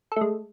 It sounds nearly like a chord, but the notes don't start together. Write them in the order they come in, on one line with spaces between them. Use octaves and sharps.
A4 A3 G#3